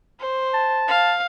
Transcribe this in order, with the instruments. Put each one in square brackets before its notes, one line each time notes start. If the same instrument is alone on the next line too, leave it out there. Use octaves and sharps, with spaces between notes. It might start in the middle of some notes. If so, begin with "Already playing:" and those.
[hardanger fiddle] C5
[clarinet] A5
[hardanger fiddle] F5